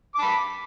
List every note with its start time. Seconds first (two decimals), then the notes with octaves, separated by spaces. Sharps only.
0.15 D6
0.19 A5
0.22 B5